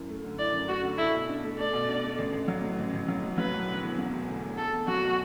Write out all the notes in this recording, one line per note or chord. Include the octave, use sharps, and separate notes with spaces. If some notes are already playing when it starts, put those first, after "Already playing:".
Already playing: F#2 E4
A3
D3
E4 D5
F#2
A3 F#4
D3
E4 A4
B2
D4
A3
A4 D5
B2
D4
A3
A1
A1
F#3
A2
A1
A1
F#3
A2
F#3 B4
E1
D3
E2
F#3
E1
D3
E2
A3 A4
E2
F#3 F#4
B2